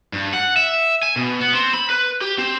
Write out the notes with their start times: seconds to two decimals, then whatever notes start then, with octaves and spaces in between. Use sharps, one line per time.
0.13 G2
0.34 F#5
0.56 E5
1.03 G#5
1.16 B2
1.40 B3
1.54 C4
1.74 B5
1.90 B4
2.21 G4
2.38 C4